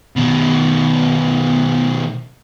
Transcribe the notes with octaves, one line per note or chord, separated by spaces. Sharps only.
B2 D#3